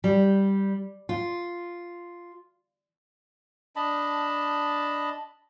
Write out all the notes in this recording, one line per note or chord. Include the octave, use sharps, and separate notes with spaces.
G3
F4
D4 D#5 A5 B5